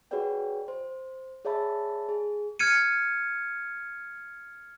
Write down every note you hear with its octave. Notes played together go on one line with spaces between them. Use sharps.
F#4 G#4 B4 C#5 D5 G5
C5
G#4 C#5 D5 E5 A5 B5
G#4
F6 G#6 C#7 D#7